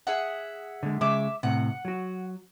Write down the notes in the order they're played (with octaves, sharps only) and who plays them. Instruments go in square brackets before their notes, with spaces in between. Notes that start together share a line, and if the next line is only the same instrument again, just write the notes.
[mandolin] G#4 E5 F#5
[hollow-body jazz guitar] D3 G#3
[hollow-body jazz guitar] C#3 G#3 [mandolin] E5 D6
[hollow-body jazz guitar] A2 C3 [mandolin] F#5
[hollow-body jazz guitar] F#3 F#4